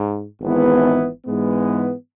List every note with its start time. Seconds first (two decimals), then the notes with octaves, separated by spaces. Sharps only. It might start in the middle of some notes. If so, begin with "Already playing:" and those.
Already playing: G#2
0.41 G#1 G#2 E3 B3 E4
1.26 G#2 E3 G#3 B3